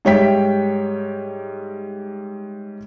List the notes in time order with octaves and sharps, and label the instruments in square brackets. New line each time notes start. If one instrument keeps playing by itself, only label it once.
[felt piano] G#2 G3 C#5 E5 G5 B6